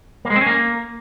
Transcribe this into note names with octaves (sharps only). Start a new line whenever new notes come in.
A#3
G#3
C4
C#4
A#3